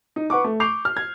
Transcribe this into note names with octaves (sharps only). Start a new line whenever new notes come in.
D#4
B4 F#5 C#6 D6
A3
C#6 D6 G6 C7 F7
F6
G#6